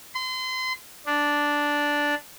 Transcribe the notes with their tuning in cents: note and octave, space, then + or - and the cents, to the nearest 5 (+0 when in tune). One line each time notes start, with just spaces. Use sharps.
C6 -30
D4 -5